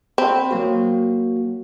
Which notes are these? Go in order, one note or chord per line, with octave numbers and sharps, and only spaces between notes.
C4 B5
F#3 A#3 F#4